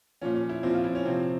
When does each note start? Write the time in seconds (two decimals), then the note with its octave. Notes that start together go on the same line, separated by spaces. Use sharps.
0.22 A#2 F3 C#4
0.35 C#4
0.49 E4
0.63 A#2 F3 C4
0.74 F4
0.84 E4
0.95 C#4
1.05 C3 F3 C4